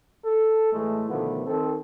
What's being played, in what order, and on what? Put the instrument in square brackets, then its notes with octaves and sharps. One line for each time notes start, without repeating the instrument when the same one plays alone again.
[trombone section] A4
A2 E3 G#3 A3
B2 D3 D#3 F3 A3 B3
D#3 C4 A4